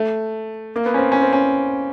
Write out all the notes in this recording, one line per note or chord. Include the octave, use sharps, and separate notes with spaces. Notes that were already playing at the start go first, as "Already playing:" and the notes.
Already playing: A3
A#3
B3
C#4
C4
C#4
C4
C#4